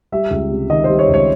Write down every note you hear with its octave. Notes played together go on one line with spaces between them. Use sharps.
G3 E5
C#2
C3
D#3 D#5
G3 C5
C#5
C#2
C#5